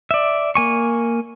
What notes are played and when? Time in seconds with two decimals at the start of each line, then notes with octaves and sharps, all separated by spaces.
0.11 D5 E5
0.55 A#3 G#5 C#6